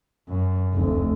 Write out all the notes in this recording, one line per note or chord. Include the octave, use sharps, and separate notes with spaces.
F#2
F1 D2